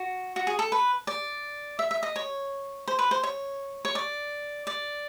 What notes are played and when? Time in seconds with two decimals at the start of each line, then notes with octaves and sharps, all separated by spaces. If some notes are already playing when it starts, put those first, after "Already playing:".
Already playing: F#4
0.36 F#4
0.47 G#4
0.59 A4
0.72 B4
1.07 D5
1.79 E5
1.91 E5
2.03 D#5
2.16 C#5
2.88 C5
2.99 B4
3.11 C5
3.23 C#5
3.85 C#5
3.95 D5
4.67 D5